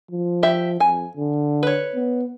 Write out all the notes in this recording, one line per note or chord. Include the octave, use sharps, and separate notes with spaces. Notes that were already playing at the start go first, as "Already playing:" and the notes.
F3
G4 E5
F2 G#5
D3
B4 C#5
B3